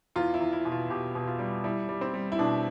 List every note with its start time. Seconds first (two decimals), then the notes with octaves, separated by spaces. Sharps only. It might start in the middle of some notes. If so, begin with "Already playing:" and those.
0.16 E2 F4
0.34 E4
0.40 E2
0.53 E4
0.65 B2
0.72 F4
0.90 B2 G4
1.15 B2
1.27 F4
1.39 G3
1.64 G3 E4
1.89 G3
2.01 C4
2.14 G3
2.32 E4
2.39 B2 D4